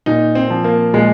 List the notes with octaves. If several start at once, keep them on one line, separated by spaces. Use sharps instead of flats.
A#2 D#4
C4
F3
A#3
A#2 G#3